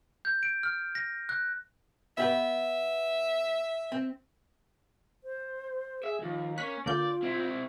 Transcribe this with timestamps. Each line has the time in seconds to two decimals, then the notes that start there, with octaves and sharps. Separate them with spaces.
0.25 G6
0.43 D7
0.63 F6
0.95 A#6
1.29 F#6
2.18 B3 G4 B4 E5
3.92 C4
5.24 C5
6.03 G#4 E5
6.22 D#2 F3
6.58 A#3 C#4 F#6 B6
6.86 D3 A#3 F4 D5 G6
7.23 C4 E4